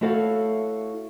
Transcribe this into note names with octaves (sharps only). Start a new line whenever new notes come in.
A3 E4 F#4 A4 C#5 F5